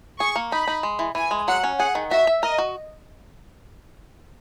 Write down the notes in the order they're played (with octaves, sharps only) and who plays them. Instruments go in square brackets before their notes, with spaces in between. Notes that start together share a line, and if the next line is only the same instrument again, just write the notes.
[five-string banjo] G#4 [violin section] C#6
[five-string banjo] A#3
[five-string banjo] D#4 [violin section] B5
[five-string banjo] D#4
G#3
E3
[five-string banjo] E3 [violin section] G#5
[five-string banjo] G#3
[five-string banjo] F#3 [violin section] F#5
[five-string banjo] C#4
[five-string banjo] G#4 [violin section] F#5
[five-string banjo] D#3
[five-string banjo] F#4 [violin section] E5
[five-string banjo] E5
[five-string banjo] A#4 [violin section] D#5
[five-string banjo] F#4